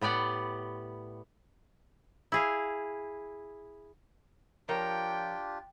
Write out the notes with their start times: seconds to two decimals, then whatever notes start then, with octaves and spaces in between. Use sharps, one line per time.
0.01 A2 B3 G4 D5 F#5
2.32 E4 G#4 F5
4.69 F3 D4 F4 G4 A#4 C#5 G5